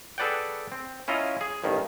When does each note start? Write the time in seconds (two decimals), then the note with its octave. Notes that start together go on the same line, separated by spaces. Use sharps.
0.18 G#4 A4 B4 D5 F#5 G5
0.72 C4
1.08 C#4 E4 F4 D#5 A#5
1.41 G#4
1.64 A1 G2 D#3